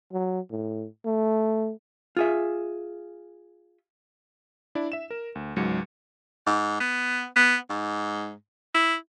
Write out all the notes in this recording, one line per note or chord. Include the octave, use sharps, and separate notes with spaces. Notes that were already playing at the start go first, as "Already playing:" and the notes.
F#3
A2
A3
F4 G#4 E5
D4 E4 D5
E5 E7
A#4
D2
C#2 G#2 F#3 C#7
G#2
B3
B3
G#2
E4